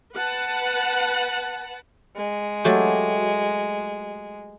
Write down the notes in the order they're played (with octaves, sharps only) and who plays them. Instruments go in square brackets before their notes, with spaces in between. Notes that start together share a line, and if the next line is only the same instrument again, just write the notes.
[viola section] B4 F#5 A5
[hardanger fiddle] G#3
[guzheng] F#3 A3 G4